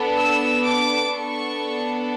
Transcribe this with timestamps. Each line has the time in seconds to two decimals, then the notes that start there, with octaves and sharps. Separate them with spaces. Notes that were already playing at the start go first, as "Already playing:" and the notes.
Already playing: B3 D4 A4
0.17 E6
0.65 D6
1.13 B3 D4 A4 C#6